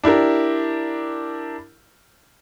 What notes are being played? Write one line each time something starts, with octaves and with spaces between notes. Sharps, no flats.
D4 E4 G4 A#4